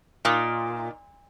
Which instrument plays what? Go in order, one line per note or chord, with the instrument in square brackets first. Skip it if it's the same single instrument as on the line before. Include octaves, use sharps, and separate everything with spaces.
[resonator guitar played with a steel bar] A#2 [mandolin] D#4 F4 D5